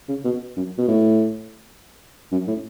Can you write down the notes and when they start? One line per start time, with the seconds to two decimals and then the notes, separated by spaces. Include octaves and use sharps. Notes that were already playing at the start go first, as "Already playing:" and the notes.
0.08 C#3
0.24 B2
0.56 F#2
0.78 B2
0.88 A2
2.32 F#2
2.47 A2